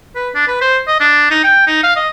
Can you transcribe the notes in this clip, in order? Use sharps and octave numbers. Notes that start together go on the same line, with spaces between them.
B4
D4
B4
C5
D#5
D4
D#4
G5
D#4
F5
D#5